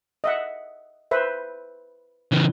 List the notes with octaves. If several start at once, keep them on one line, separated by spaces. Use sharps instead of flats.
D#5 E5 F#5
B4 C5 E5
C#3 E3